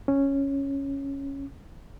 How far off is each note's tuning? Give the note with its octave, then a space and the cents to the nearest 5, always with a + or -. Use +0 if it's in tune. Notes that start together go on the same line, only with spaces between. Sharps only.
C#4 -5